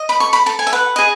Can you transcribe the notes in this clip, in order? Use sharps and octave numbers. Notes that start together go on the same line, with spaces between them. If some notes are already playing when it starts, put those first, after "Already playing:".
Already playing: D#5
B5
A4 C#6
B5
A4 A5
G#5
E5
B4 F#5
G#4 D#5